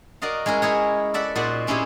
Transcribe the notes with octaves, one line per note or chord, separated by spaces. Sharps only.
F#4 A#4 D5 D#5 F5
G#3 C#4 E4 A#4
E4 G#4 C#5
A4 D5 E5 F#5
A#2 D#4 F#4 C5 D5 F#5
C4 C#4 E4 G4 G#4